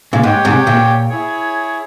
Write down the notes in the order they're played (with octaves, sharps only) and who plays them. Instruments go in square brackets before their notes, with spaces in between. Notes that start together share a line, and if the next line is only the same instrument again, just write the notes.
[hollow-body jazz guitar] A#2 C#3
[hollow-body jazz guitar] G#2 [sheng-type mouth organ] G4 C#5 G5
[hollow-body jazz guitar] G#2 C3
A#2
[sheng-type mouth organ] E4 G#4 C#5